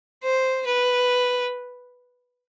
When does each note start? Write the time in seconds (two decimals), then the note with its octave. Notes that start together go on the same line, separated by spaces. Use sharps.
0.23 C5
0.66 B4